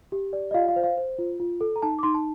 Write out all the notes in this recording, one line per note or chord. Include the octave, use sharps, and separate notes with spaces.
G4
D5
D#5
F4 F5
F5
C5
F5
C5
F4
F4
A4
A#5
D#4 A5
D6
D#4 C6
A5